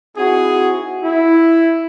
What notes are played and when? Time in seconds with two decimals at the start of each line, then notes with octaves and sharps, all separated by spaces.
0.16 C4 D#4 E4 F#4 G#4
1.03 E4